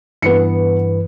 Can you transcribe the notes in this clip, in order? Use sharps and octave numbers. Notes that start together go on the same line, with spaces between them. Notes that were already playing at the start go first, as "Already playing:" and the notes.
G2 E3 B3 B4 C#7